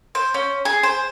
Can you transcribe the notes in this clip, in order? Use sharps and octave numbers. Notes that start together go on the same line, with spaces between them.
C5
C#4
G#4
C5